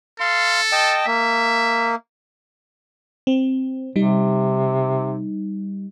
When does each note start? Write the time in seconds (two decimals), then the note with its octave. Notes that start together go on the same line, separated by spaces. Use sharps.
0.20 A4 F5 C6
0.72 D#5 G5 A5
1.07 A#3 E5
3.27 C4
3.96 C3 G3 D#4